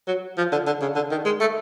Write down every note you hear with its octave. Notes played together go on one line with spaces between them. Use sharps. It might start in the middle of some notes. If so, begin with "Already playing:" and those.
F#3
F3
D3
D3
C#3
D3
D#3
G#3
A3